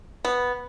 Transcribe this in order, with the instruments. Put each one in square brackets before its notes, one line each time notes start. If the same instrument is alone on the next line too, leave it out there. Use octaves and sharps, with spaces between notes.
[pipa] B3